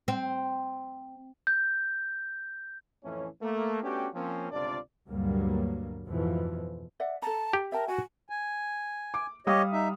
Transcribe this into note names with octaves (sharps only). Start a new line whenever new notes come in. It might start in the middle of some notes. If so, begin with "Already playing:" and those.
C4
G6
F2 A2 E3 A3 C#4
A3 A#3
A3 B3 C#4 D4 F#4 G4
F3 A#3 C4 C#4
G1 C#2 C3 D4 F4 D5
D2 G2 A#2 F#3 G3 A#3
F2 G#2 B2 E3 F3
D5 E5 F#5
A4 A5 A#5
G4
A#4 E5 G5 A5
F#4 G#5
G#5
D6
G3 G4 C#5 D#5 F5 D#6
D#4 E5